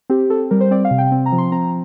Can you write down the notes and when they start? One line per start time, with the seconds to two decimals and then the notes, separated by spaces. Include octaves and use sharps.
0.10 C4 G4
0.30 C4 A4
0.51 G3 A#4
0.61 C5
0.71 C4 D5
0.85 F5
0.91 C3
0.98 G5
1.12 C4
1.26 A#5
1.32 F3
1.38 C6
1.52 C4 A#5